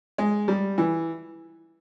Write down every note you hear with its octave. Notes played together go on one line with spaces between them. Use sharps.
G#3
G3
E3